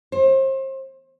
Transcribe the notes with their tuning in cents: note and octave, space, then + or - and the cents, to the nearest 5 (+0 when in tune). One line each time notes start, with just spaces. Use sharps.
C5 +35